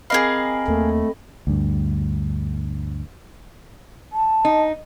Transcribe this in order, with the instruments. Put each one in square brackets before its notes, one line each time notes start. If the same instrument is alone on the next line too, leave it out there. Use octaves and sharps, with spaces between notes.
[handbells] C4 D#5 B5 [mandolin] G#4 A#4 F5
[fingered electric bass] D#2 A#3 [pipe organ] A3
[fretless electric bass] D2 G2
[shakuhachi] A5
[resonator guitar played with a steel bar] D#4